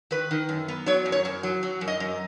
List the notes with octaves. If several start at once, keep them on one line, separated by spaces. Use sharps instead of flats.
D#3 B4
D#3
F#2
B3
F#3 C#5
F#2
C#5
F#2
F#3
F#3
F#2
D#5
F#2